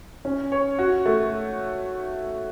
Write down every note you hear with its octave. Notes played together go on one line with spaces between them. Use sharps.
C#4
C#5
F#4
A3